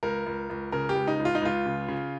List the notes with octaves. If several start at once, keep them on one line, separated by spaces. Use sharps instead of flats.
C#2 A#4
C#2
C#2
C#3 A#4
G4
C#2
D#4
C#2
F4
D#4
C#2 F4
C#3
C#3